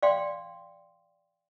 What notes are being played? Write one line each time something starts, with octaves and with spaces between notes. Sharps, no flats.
D5 F5 G5 C6